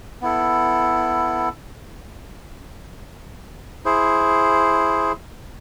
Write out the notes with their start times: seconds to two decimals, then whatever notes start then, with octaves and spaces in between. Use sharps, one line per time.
0.21 B3 E4 A4
3.85 E4 G#4 C5